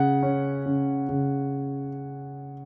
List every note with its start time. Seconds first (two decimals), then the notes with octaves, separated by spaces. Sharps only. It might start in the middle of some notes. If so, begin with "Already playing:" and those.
Already playing: C#3 F#5
0.23 C#4
0.66 C#3
1.09 C#3